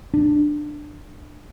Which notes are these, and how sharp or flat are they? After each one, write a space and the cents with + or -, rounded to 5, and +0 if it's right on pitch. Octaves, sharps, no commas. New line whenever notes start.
D4 +15